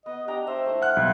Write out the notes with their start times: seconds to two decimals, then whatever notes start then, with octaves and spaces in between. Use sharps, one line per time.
0.06 B3 D#5
0.28 D4 G4 G5 A#5
0.47 C5 E5
0.66 A3 E4
0.82 F#5 F6 F#6
0.97 B1 G3